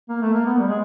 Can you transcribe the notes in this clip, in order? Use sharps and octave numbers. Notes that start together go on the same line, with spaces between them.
A#3
A3
A#3
B3
G3
G#3